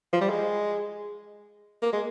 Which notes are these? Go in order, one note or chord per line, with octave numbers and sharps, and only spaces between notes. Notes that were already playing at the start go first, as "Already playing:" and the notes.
F3
G3
G#3
A#3
G#3